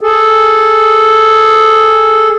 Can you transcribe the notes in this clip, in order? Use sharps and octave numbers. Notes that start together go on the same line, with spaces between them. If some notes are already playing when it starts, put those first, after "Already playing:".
G#4 A4